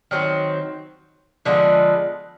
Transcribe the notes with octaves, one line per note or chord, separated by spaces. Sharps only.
D#3 F#3 A3 C4
D3 F3 G#3 B3